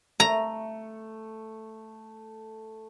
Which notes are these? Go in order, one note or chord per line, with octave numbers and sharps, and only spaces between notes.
A3 A#5